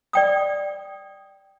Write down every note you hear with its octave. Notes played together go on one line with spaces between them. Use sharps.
D5 G5 D#6